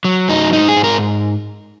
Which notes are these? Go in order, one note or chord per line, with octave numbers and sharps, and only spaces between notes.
F#3
F#2 D#4
G#2 D#4
G#4
G#2
A#4